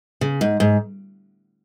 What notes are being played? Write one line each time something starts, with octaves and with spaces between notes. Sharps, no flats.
C#3
G#2
G#2